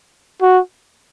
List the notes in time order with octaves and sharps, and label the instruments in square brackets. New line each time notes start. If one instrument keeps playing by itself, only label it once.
[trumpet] F#4